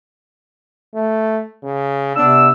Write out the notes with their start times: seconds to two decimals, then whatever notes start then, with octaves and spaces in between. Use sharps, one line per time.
0.94 A3
1.63 C#3
2.16 C3 B3 D4 E6